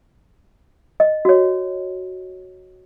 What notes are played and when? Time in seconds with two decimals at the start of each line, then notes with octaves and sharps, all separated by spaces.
1.00 D#5
1.25 F#4 C#5